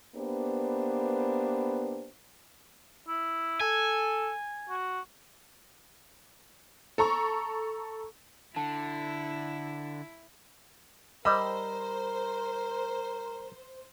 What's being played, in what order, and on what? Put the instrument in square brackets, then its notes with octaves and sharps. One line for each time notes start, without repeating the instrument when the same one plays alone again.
[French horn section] A#3 B3 D4 G4 B4 C5
[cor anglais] E4
[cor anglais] A4 [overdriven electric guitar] G#5
[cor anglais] F#4
[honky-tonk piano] A4 A#5 C#6
[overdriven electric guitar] D3 [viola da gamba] E4 [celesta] A5
[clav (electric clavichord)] G3 [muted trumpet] A#4 [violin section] C5 [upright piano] D#5 B5 E6